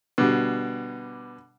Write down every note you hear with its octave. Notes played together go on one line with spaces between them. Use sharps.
B2 D3 G3